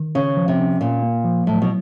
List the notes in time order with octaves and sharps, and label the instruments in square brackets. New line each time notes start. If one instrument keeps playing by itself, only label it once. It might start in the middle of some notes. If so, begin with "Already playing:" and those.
Already playing: [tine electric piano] D#3
[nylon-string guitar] C#3 [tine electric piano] C#4
[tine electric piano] F3
[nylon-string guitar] C3
[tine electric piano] C#4
[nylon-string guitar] A#2 [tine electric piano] A#3
[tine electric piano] A#3
F3
[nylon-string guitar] A2 [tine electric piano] F#3
[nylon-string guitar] B2